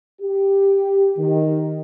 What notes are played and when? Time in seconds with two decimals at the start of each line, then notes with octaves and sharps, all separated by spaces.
0.20 G4
1.17 D#3